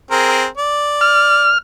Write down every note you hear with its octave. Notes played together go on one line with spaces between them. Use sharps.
C4 G#4 A#4
D5
F6